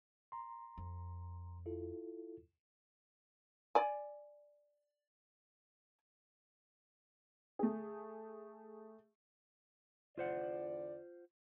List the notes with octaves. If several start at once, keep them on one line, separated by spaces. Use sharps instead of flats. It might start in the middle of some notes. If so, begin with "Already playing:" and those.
A#5 C6
F2
E4 F4 A4
D5 G#5
A3 G#4
E2 D3 F4 C5 D5 F#5